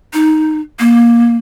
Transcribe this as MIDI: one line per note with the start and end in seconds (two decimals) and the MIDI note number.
0.14 0.60 63
0.79 1.37 58